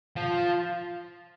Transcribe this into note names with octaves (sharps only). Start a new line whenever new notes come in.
F3